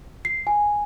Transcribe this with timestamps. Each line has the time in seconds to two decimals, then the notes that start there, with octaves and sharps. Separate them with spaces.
0.25 C7
0.47 G#5